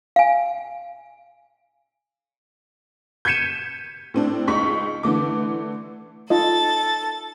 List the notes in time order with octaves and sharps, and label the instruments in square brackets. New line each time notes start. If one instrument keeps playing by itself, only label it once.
[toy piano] F5 G#5
[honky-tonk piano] G6 G#6 B6 C#7 D#7 E7
A2 C4 D4
C#2 D#4 C#6 B6
D3 E3 A3 D6
[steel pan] D#4 F4 D#5 [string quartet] A4 A6